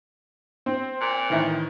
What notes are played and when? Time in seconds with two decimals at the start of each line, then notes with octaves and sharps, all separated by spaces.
0.66 C4
1.01 A#2
1.30 A2 D#3 E3 B4 E5